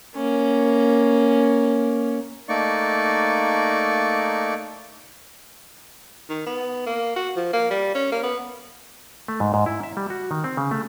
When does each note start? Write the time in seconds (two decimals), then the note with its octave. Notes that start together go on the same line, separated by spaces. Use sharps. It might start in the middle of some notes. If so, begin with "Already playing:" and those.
0.16 A#3 C#4
2.49 A3 A#3 D#4 D5 C#6
6.29 D#3
6.46 B3
6.86 A#3
7.16 F#4
7.36 F3
7.53 A#3
7.71 G3
7.95 C#4
8.12 A#3
8.23 B3
9.28 A3
9.40 G#2
9.54 G#2
9.66 E4
9.83 E5
9.97 G3
10.10 F#4
10.31 D#3
10.44 C4
10.57 C#3
10.71 A3